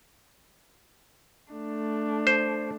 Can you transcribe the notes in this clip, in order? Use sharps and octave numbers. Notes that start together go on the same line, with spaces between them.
A3 D4
C5